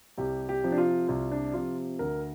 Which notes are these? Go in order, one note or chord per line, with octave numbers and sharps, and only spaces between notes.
C2 G4
G4
C3 F3
D4
F4
C2 F4
D4
C3 F3 F4
D2 A#4